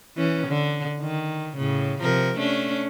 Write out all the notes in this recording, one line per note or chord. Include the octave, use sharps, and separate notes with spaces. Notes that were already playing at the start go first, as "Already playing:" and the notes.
E3 C#4
D3
D#3
A2 C#3
C3 F3 A#4
A3 C#4 D4